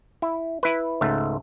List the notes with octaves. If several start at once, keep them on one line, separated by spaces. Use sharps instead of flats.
E4
E4 B4
C#2 G#2 A3